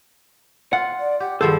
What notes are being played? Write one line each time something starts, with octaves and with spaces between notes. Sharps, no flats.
F4 F#5
D5
G4 F#5
G2 D#3 F3 G#4 A4 C5